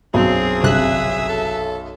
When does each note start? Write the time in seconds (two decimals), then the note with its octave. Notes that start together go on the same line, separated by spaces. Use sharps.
0.14 B1 F#2 C4 G#4
0.63 G1 C3 E5 F#6
1.29 A4